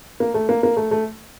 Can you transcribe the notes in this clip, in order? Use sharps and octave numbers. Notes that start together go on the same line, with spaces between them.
A#3
A3
A#3
A#3
A3
A3